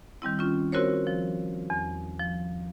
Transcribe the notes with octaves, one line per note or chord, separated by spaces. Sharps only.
D#3 G3 C4 E4
C#4 F4
C4 E4 F#4 A#4 C5 C#5
F3
E2
F3